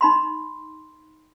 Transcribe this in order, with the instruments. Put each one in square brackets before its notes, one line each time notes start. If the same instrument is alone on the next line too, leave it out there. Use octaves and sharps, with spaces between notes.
[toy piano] D#4 B5 C6